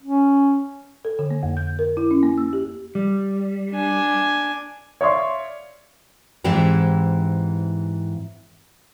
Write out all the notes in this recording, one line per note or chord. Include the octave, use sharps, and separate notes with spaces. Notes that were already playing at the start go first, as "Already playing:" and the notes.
C#4
A4
D3
A#3
F2
G6
A#4
E4
C#4
A#3
E6
G4
G3
D4 G#5
C#5 D5 E5 F5 C6 C#6
G#2 E3 C4 E4 G4 G#4